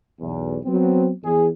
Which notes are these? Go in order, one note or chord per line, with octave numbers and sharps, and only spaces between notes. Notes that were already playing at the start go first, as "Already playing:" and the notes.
B1 E2
F#3 B3 C4
E2 G#4